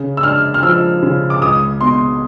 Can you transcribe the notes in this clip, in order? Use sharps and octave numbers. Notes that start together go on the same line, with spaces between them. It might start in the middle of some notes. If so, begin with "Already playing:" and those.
Already playing: C#3
E6
D4 F6
F6
F3 E6
C#3
D6
C#2 D#6
B2 C6